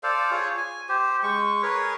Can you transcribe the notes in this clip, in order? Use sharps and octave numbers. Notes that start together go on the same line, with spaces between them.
A4 C5 D5 F5
F4 G#4 C#5
G#5
G4 C5
G#3 C#6
G#4 A#4 B4 C#5